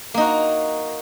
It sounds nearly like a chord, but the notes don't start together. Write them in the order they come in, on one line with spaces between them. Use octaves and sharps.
A#3 D#4 F#4